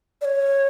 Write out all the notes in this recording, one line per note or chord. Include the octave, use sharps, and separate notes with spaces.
D5
C#5